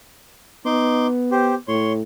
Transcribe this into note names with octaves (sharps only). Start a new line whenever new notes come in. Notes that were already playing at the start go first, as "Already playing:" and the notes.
B3 D#4 C6 D6
G4 C5
A2 C#5 C6